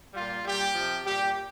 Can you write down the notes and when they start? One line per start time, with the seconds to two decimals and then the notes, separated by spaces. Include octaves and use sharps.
0.13 A#2 G3 F4
0.43 A#2 G3 G4
0.74 C3 F3
1.05 A#2 G3 G4